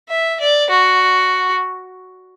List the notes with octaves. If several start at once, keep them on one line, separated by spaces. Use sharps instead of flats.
E5
D5
F#4